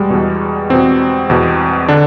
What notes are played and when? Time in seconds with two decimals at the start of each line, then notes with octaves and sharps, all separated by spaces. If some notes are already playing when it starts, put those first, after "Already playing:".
Already playing: E2 B2 G3 G#3
0.10 E2 B2
0.70 E2 B2 C4
1.30 E2 B2
1.88 D3 D4